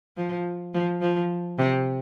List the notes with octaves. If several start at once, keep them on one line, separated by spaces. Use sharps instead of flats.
F3
F3
F3
C3